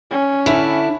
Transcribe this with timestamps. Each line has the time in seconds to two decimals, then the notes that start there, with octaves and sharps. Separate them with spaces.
0.11 C#4
0.46 D3 E4 E5 B5